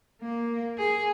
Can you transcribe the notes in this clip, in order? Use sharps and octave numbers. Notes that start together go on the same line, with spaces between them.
A#3
G#4